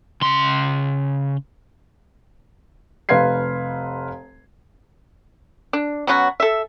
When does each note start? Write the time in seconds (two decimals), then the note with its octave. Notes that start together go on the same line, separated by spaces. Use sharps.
0.22 C#3 C6
3.09 F1 B4 F5 C6 G#6 C7
5.73 D4
6.07 F#3 B3 C#4 F#4
6.40 A4 E5